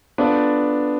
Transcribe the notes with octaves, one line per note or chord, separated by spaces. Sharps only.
B3 D4 F4 A4 D5